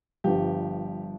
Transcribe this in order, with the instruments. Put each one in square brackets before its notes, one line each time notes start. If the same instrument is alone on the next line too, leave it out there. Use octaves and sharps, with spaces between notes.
[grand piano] G1 G2 F3 G4